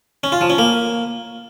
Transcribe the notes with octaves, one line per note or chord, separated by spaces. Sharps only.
C#4
F4
F3
C#4
A#3